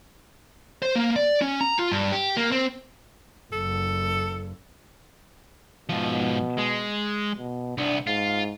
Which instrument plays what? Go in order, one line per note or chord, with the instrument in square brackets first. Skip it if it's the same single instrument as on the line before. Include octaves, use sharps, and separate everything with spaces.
[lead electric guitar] C5
A#3
D5
C#4
A#5
F4
G2
G4
A#3
C4
[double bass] F#1 [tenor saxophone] A4
[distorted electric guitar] G#2 F3 [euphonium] B2
[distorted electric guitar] G#3
[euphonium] B2
[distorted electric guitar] C2 B3 [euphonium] D4
[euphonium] G#2 [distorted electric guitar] F4